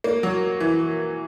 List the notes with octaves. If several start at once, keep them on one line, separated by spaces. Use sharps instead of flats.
A#3
F#3
E3